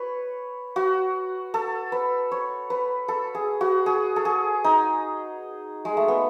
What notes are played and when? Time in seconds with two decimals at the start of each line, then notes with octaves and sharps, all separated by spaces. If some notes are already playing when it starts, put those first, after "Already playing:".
Already playing: B4 C#5
0.76 F#4
1.54 A4
1.92 B4
2.32 C#5
2.70 B4
3.08 A4
3.35 G#4
3.61 F#4
3.86 G#4
4.16 A4
4.25 G#4
4.64 D#4
5.85 G#3
5.97 A3
6.08 B3